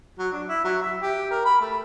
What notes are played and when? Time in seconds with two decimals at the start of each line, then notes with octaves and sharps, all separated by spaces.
0.19 F#3
0.32 D4
0.48 E4
0.64 F#3
0.82 E5
1.02 G4
1.31 A#4
1.45 B5
1.61 A3